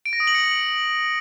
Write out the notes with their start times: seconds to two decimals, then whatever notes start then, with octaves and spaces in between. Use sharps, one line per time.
0.06 D7
0.13 A#6
0.20 D#6
0.27 F#7
0.35 C#7